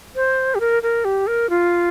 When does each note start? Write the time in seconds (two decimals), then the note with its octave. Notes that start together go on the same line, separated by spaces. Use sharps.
0.15 C5
0.55 G4
0.60 A#4
0.83 A#4
1.05 G4
1.27 A#4
1.50 F4